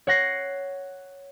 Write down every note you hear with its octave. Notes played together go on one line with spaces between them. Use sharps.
C#5 F#5 A#6 C7